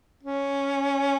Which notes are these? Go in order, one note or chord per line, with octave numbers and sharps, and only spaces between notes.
C#4